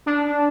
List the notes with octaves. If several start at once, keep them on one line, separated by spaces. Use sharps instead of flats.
D4